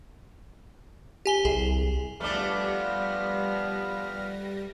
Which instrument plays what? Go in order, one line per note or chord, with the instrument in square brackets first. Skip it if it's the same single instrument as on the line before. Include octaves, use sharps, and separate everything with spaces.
[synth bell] G4 G#5 G7
[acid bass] C2 [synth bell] G#4
[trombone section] F3 B3 [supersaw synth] G3 A#6 [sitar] A3 D4 [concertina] B4 F6